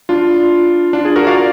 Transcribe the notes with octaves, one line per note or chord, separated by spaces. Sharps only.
D4 F4
D4 F4
F4 G#4
F#4 A#4
D5 F5